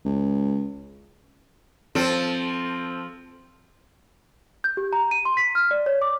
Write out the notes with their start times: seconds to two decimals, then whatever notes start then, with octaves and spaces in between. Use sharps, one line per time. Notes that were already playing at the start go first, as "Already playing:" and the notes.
0.05 C#2
1.95 F3 C4 A4
4.64 G6
4.77 G4
4.93 A#5
5.11 D#7
5.25 C6
5.37 B6
5.55 F6
5.71 D5
5.86 C#5
6.02 D6